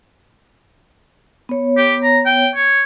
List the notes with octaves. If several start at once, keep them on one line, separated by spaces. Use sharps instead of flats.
B3 C#5
G4
A#5
G5
C#5